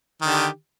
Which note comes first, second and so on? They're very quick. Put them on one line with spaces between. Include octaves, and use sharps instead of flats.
D#3 D3 G4